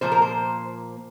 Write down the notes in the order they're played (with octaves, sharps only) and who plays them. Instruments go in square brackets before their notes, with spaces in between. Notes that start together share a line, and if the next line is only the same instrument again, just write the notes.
[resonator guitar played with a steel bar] A#2 F3 A#3 C5
A#4
C5